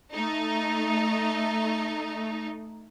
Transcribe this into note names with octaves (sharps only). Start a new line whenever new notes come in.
A3 D#4